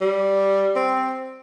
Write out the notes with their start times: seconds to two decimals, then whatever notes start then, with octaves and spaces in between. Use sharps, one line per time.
0.01 G3
0.76 C4